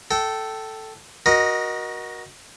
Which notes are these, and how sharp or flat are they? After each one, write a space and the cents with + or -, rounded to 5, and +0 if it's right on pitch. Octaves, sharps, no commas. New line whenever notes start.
A4 +0 G5 -20
F#4 +0 A#4 +30 D#5 -5